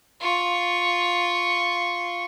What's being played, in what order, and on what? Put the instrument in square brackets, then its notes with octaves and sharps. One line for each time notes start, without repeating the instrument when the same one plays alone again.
[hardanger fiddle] F4 C#6